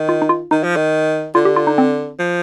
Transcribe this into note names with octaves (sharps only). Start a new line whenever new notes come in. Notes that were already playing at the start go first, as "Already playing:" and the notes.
Already playing: D#3
F4
D#4
F4
D#3 D#4
F3
D#3
D3 F4
G4
F4
D#4
C4
F3